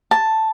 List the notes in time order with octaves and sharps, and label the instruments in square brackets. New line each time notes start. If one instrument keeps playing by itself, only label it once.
[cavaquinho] A5